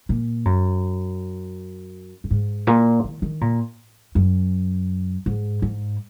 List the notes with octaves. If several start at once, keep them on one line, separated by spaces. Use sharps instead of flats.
A#2
F#2
A#2
G#2
A#2
D#3
D#3
A#2
F#2
G#2
G#2